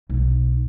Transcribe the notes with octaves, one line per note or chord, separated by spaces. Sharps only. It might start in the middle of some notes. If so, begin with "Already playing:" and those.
B1